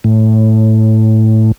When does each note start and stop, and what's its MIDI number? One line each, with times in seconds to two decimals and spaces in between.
0.04 1.52 45